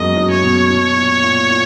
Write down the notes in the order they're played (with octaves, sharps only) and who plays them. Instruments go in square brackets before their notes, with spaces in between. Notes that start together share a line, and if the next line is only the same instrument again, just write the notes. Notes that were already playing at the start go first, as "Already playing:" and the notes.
Already playing: [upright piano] F#2 F#3 G#3 A#3 B3 [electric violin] D#5
[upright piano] F#2 F#3
[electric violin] C#5
[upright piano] B2
B2
A#2
A#2
A#2